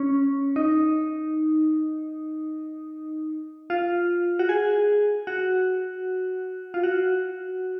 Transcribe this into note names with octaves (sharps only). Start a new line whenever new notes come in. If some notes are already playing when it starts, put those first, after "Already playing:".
Already playing: C#4
D#4
F4
F#4
G#4
F#4
F4
F#4